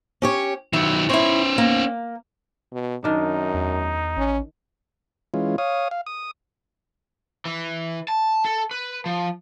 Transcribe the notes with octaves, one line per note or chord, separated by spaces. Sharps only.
C#4 G4 C#5
D#3 F#3 E4
C#4 E4 C5 C#5
A#3
B2
F#2 D#3 D4 D#4
E2
A1 C#4
E3 G#3 C#4 F4
C#5 F5 D#6
F5
D#6
E3
A5
A4
B4
F3